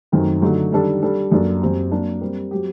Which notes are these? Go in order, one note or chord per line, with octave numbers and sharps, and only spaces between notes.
F#2 D#3 F#3 A3 C4
D3 F#3 A3 D#4
D#3 G3 D4 A4
G3 D4 A4
F#2 F#3 A#3 D4 A4
F#2 F#3 C4 G4
F#3 A#3 D4
G3 C4 G4 A#4
F#3 C4 G4